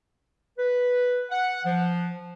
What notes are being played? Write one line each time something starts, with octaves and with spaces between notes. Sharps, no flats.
B4
F#5
F3